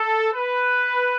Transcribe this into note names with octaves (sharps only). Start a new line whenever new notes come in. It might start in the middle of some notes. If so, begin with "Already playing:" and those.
Already playing: A4
B4